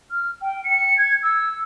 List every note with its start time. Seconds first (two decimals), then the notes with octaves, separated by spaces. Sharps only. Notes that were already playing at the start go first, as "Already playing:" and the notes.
0.10 F6
0.41 G5
0.64 C#7
0.97 G#6
1.23 E6